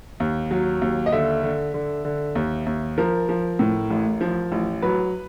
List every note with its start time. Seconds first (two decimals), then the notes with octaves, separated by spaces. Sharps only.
0.20 D#2
0.51 F#3
0.82 D#2
1.06 D#5
1.12 D3 E5
1.43 D3
1.74 D3
2.05 D3
2.35 D#2
2.66 D#2
2.98 F3 A#4
3.29 F3
3.59 A2
3.90 A1
4.21 F3
4.52 A1
4.82 F#3 B4